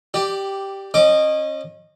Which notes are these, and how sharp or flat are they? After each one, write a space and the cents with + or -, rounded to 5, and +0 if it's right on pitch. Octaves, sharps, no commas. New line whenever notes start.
G4 -5 D5 +15
C#4 -30 D#5 -15 D6 +15